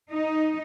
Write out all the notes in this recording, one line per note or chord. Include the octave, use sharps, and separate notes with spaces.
D#4